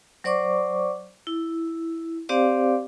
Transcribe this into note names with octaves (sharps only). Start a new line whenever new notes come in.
F#3 C5 D5 C#6 D6
E4
C4 G4 C5 D5 F5 D6